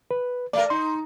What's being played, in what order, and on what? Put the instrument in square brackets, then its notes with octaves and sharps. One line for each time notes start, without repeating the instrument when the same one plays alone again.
[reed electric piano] B4
[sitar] A3 A#4 [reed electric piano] D5
[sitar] D#4 [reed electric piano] C6